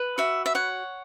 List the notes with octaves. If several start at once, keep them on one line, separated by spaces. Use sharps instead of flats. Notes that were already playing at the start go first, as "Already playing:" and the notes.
Already playing: B4
F#4 E5
E5
C#5 F#5